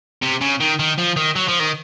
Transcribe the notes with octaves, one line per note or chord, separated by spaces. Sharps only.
C3
C#3
D#3
D#3
F3
D#3
F#3
F3
D#3